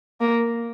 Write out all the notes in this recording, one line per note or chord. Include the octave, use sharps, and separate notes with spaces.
A#3